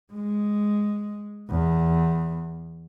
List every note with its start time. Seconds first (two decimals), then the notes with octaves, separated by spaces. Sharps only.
0.13 G#3
1.50 E2